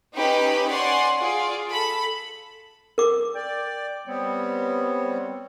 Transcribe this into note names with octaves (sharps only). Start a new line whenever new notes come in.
C#4 D#4 G4 B4 G5 B5
C#5 D5 F#5 G#5 C6
F4 G#4 D5
A4 B5
A#4 D6
D5 G5
G3 B3 C4 C#5